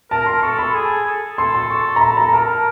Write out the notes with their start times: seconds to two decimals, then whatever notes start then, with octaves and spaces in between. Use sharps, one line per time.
0.11 A#4 A5
0.26 C6
0.42 A4 C#6
0.59 B5
0.74 G#4
1.06 A4
1.38 A4 C6
1.54 C6
1.70 C#6
1.96 A#5
2.01 B5
2.17 A#5
2.29 A#5
2.33 A#4 A5